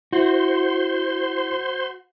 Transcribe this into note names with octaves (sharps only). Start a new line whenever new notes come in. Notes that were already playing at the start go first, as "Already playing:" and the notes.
E4 F#4 C5 C6